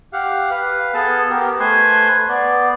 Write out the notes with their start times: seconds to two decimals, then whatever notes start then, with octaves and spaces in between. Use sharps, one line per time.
0.13 G4 F5 F#5
0.51 B4 F5
0.94 B3 G#4 A4 A5
1.30 B3 G4 A#4
1.60 A3 B4 C5 G#5 C6
2.29 B3 D5